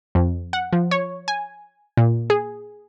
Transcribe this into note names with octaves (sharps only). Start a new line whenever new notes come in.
F2
F#5
F3
C#5
G#5
A#2
G#4